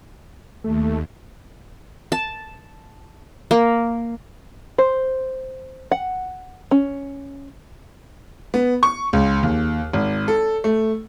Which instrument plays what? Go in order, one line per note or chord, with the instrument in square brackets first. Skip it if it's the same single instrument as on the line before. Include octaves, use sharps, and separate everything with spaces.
[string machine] D#2 [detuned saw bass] A3
[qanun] A5
A#3
[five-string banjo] C5
F#5
C#4
[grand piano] B3
C#6
C#2
D#2
G#1
A4
A3